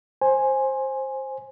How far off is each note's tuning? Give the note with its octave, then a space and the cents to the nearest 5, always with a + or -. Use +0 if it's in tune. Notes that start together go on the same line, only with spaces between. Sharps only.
C5 +15 G#5 +0